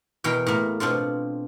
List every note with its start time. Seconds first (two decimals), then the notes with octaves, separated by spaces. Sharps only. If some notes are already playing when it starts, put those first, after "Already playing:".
0.24 E2 B2 A#4 G5
0.46 A2 A#3
0.80 B2 C4 D4 F4